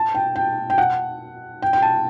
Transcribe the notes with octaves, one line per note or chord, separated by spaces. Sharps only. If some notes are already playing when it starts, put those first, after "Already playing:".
Already playing: A5
G5
G5
G5
F#5
G5
G5
A5